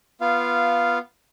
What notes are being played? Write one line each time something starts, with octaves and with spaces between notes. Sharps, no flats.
B3 F4 F5